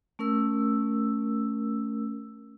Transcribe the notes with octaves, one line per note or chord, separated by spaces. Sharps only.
A3 C#4 A#4 E6